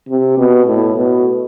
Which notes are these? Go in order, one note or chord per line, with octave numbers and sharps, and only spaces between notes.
C3
B2
A2
B2